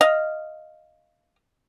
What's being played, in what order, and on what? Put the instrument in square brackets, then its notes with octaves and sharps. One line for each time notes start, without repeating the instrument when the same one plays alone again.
[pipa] D#5 F5